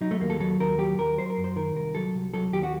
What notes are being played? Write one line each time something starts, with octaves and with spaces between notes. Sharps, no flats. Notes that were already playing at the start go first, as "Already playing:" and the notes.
F#3 D#4
A3
D#2 A#3
A4
F#3 A4
D#2 A#4
F#3 G4
D#2 A#4
F#3 C5
A#4
F#2
C5
D#3 A#4
C2 A#4
F#3 A4
C2
F#3 A4
D#2 G4
F#4